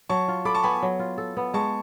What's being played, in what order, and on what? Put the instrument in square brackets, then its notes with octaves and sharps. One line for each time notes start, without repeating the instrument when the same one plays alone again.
[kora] F#3 [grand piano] A5 C#6
[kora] F4
[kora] A4 [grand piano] B5 D6
[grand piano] A5 C#6
[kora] B3 [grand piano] G#5 B5
[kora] F#3
F4
A4
B3
[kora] G#3 [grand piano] A5 C#6